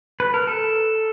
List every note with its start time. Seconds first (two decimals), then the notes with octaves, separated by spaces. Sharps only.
0.20 B4
0.34 A#4
0.47 A4